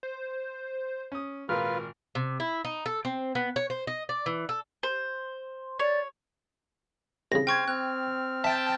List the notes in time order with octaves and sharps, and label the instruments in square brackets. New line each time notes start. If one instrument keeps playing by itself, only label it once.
[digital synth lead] C5
[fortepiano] C#4 D#6
[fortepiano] G#1 A#2 A#4 [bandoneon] F4 B4 [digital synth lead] F6
[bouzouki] C3
E4
D#4
A4
C4
B3
C#5
C5
D#5
D5
E3
A4
[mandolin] C5
[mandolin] C#5 [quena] D5
[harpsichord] C2 C#3 [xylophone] A#6
[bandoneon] C5 F6 [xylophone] G5 C#6 G#6
[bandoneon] C4 F6 [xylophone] F#6
[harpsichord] E5 [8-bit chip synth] G5 A5 [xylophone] B6